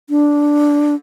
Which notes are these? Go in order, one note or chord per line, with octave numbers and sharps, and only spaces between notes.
D4